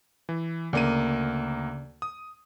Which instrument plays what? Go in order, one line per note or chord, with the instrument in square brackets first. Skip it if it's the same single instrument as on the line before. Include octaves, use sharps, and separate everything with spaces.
[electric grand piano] E3
[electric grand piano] D2 A#3 D#7 [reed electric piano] C#3 D5
[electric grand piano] D#6